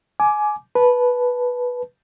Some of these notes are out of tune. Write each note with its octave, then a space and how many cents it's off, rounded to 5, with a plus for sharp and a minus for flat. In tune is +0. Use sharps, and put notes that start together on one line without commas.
G#5 +20 D6 +0
B4 -5 A5 -15